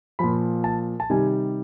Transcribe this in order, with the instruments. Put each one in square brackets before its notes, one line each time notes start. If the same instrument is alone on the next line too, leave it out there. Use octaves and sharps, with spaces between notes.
[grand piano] A#2 F3 B5
A5
A5
C3 D#3 G3 G#5